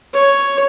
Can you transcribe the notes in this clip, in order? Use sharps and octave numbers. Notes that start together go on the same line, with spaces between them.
C#5